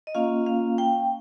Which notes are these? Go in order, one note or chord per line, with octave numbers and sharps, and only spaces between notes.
D#5
A#3 C#4 F4 F5
F5
G5